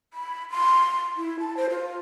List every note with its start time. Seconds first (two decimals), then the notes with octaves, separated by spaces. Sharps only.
0.14 B5
0.51 C6
1.17 E4
1.40 A5
1.57 C5
1.70 F4